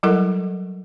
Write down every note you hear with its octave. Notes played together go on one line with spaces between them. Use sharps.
F#3 G3 E4 A4 A#4 F#5